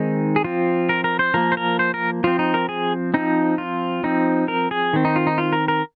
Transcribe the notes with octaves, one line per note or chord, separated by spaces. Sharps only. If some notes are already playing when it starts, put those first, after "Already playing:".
Already playing: D#3 G#3 C4 D#4
G#4
F3 C4 F4
A#4
A#4
C5
F3 A#3 A#4
C5
A#4
C5
A#4
F3 C4 F4
D#4
A#4
G#4
F3 C4 D#4
F4
F3 C4 D#4
A#4
G#4
D#3 C4
D#4
F4
D#4
F4
A#4
A#4